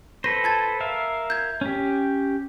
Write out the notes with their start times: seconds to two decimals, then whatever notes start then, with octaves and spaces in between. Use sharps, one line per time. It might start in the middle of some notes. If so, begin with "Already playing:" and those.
0.24 A4 B4 C5 A#6
0.44 A5 G#6 A6
0.80 A#4 E5 F5
1.30 G6 G#6
1.61 C#4 G4